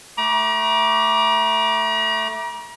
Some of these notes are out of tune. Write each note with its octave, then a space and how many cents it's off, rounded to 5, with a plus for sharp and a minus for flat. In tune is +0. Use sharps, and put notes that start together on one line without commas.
A3 +0 A#5 +40 D6 +0